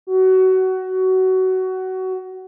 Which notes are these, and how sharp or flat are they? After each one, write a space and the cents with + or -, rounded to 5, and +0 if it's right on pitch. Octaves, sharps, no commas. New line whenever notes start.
F#4 +20